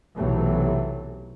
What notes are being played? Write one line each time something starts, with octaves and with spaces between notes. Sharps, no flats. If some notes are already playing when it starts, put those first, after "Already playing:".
B1 C3 E3 F#3 A3